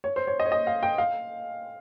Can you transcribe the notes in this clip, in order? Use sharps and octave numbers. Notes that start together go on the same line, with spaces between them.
C#5
C5
C#5
D#5
C#5
D#5
F5
G5
F5